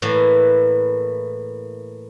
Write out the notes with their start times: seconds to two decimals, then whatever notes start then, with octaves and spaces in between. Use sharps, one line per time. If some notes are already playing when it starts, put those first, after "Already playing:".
0.02 A2 E3 A#3